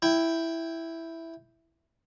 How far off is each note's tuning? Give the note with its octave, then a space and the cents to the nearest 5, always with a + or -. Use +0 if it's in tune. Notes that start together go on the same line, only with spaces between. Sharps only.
E4 +0 G5 +0